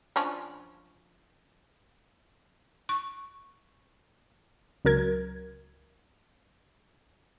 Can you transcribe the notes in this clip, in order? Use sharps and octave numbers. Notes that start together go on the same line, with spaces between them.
F3 C#4 D4
C#6
C#2 F#3 A#4 G#6